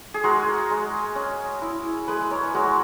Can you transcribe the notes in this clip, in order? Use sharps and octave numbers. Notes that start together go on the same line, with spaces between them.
G#4
G#3 F#4 A#4
G#3
C#4
E4
G#3 G#4 B4
A#4 C#5
G#3 F#4 A#4